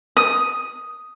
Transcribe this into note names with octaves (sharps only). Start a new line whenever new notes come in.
D#6